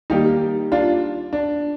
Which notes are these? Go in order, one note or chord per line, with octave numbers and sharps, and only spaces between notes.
D#3 G3 A#3 D#4 G4
D4 F4
D4